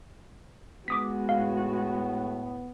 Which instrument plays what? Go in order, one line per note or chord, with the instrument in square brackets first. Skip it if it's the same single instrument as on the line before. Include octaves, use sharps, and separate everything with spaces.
[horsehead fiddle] G#3 F#4 [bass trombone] B3 [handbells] D6 D#6 B6
[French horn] A2 [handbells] F5